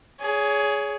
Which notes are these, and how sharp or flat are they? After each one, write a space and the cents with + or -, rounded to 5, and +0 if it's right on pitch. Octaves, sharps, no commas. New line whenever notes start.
G#4 +10 C#5 +30